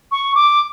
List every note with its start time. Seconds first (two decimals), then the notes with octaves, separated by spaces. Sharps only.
0.12 C#6
0.35 D6